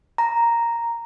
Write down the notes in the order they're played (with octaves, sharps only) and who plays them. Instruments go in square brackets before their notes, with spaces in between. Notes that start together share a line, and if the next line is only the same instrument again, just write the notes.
[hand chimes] A#5